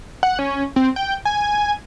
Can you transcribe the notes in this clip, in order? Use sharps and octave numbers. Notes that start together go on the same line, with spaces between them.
F#5
C#4
C4
G5
G#5